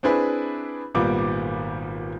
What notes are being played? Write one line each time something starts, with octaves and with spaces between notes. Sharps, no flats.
C4 D4 E4 G#4 B4
G#1 A#2 G3 A#3 B3 D6